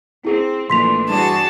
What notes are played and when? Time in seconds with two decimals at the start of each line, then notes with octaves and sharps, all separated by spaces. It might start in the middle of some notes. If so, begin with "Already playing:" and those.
0.25 C4 E4 G#4
0.70 A#1 A#2 E3 A3 D4 C6 B6 F7
1.09 G2 E3 F#4 G#4 D5 A5